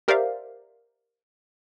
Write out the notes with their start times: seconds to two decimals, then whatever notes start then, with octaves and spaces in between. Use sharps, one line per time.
0.08 G4 A#4 C5 D5 E5 F5